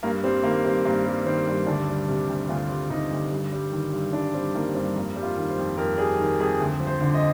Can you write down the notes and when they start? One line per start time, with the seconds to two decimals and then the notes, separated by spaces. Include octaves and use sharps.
0.03 G2 A#3
0.24 G3 C4
0.43 D#3 A#3
0.64 G2 C4
0.85 G2 A#3
1.05 G3
1.26 D#3 C4
1.47 G2
1.67 D2 D4
1.88 G3
2.08 C3
2.29 D2
2.49 D2 F4
2.69 G3
2.90 C3 D#4
3.11 D2
3.31 G2
3.53 G3
3.72 D#3
3.93 G2
4.13 G2 D4
4.34 G3 C4
4.54 D#3 A#3
4.75 G2 C4
4.96 F2 A#3
5.16 G3
5.22 F4
5.36 D#3
5.50 C5
5.58 F2
5.77 F2 A#4
5.98 G3 G#4
6.19 D#3 A#4
6.40 F2 G#4
6.60 D2
6.80 F3
6.87 C5
7.01 D3
7.14 D#5